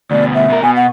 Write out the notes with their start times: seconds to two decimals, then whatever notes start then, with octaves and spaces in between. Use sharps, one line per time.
0.11 D2 B2 D5
0.34 E5
0.49 B2 A#4
0.63 B2 G#5
0.76 F#5